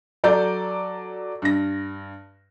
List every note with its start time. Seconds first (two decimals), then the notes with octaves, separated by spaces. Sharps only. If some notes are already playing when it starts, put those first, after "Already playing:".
0.24 F#3 A4 D5 A#5 G6
1.42 G2 A#6